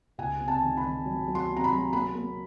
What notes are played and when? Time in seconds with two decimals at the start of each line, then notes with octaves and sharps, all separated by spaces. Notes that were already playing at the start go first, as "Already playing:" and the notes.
0.18 C#2 G#5
0.40 C3
0.48 A5
0.62 D#3
0.77 B5
0.84 D#3
1.06 F#3
1.28 F#3
1.35 C6
1.49 C3
1.57 A#5
1.64 B5
1.71 F#3
1.93 A#3 B5
2.15 A#3